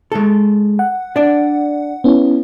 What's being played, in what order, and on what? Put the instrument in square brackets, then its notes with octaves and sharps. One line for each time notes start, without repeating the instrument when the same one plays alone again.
[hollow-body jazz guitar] G#3 A4
[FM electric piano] F#5
[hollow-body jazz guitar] D4 D5
[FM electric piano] B3 C#4 E4